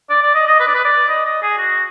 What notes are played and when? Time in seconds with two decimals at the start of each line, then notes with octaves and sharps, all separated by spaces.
0.10 D5
0.22 D5
0.34 D#5
0.47 D#5
0.60 B4
0.67 D5
0.75 B4
0.85 D5
1.08 D#5
1.26 D#5
1.42 G#4
1.58 F#4